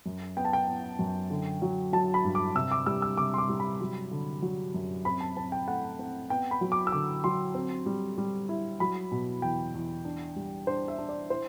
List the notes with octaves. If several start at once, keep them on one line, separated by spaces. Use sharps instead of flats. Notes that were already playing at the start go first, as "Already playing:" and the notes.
F#2
B3 G5
A5
G5
B3
F#2
D3
F#3
F#3 A5
B5
G2
D6
C3 E6
D6
G3 E6
E6
C3 D6
C6
D6
G3
B5
F#3
D3
F#3
F#2
C4 B5
A5
C4 A5
G5
A3 F#5
C4
B3 G5
B5
F#3
D6
E6
D3 D6
F#3 C6
C4
G3
G3
E4
F#3 B5
B2
E2 G5
E2
D4
G3
D4 C5
E5
D4
D5
E4 C5